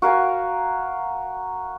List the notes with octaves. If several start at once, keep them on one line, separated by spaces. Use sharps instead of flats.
F#4 A#4 F5 G#5